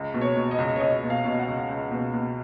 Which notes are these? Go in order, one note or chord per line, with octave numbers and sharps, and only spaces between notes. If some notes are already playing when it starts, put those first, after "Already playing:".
Already playing: C#2
B2
C#5
B2
D#5
C#2
C#5
C#2 D#5
B2
F5
B2
F#5
C#2
C#2
B2
B2